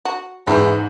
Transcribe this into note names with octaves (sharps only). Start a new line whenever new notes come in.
F#4
E2 G#2 G3 C#4 E5